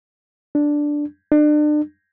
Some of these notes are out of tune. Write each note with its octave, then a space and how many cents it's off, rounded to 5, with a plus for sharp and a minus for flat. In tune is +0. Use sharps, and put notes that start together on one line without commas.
D4 +0
D4 +35